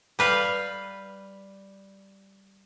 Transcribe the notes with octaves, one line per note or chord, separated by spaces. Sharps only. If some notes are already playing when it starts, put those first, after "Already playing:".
G3 B4 F5